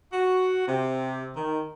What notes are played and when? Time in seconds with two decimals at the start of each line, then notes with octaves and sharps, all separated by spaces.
0.13 F#4
0.68 C3
1.36 D#3